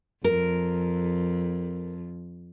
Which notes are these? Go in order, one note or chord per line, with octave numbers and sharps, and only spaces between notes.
F2 A#4